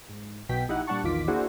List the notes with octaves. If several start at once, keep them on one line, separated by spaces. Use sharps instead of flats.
G#2
B1 B2 G5 B6
A#1 D#4 E4 G4 D#5 F#5
A#2 G3 D4 F#5 A5 C#6
A#1 E2 D#3 F4 D6 B6
A#3 D4 E4 F#4 G#4 C5